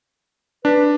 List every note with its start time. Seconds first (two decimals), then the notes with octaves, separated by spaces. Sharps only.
0.65 D4 B4